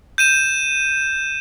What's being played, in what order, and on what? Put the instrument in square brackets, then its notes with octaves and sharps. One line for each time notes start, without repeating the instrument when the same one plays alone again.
[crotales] G6 D#7 E7